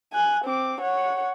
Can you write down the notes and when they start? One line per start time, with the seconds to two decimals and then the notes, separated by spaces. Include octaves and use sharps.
0.13 G#5 F#6
0.44 C4 D6
0.81 C#5 F#5